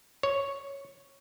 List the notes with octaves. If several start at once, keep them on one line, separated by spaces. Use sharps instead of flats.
C#5